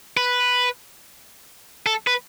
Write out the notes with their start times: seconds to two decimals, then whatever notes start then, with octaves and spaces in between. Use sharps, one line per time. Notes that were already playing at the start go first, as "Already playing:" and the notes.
0.17 B4
1.86 A4
2.07 B4